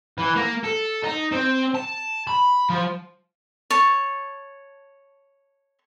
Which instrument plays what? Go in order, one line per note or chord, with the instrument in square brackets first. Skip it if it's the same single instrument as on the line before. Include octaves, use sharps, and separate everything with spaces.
[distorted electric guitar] E3
A#3
A4
D#4
C4
A5
B5
F3
[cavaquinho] C#5 A5